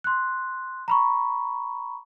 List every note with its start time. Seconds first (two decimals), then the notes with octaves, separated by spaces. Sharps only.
0.04 C6 F#6
0.88 A#5 B5 C#6